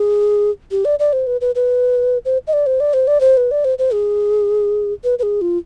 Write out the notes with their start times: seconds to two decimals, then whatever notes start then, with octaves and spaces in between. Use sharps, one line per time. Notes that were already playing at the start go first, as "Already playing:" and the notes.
Already playing: G#4
0.71 G4
0.85 D5
0.99 D5
1.13 C5
1.27 B4
1.41 B4
1.55 B4
2.25 C5
2.47 D#5
2.53 D5
2.66 C5
2.80 D5
2.94 C5
3.07 D5
3.21 C5
3.37 B4
3.51 D5
3.65 C5
3.79 C5
3.93 G#4
5.04 B4
5.19 B4
5.23 G#4
5.41 F4